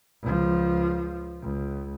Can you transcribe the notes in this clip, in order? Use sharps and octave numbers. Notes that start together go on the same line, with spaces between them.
C#2 F3
C#2